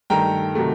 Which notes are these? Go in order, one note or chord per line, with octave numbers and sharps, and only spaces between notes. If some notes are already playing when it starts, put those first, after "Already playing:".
G2 D#3 A3 G5 A#5
C3 D#3 F#3 A3